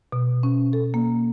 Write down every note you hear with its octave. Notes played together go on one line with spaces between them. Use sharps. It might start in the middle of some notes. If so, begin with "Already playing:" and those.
B2
C#4
A4
A#3